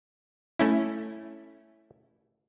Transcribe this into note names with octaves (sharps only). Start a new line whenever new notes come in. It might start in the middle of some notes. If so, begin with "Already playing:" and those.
A3 C#4 E4